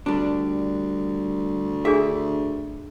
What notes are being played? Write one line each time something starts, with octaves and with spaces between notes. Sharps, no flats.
D2 G3 D4
D4 G#4 A4 E5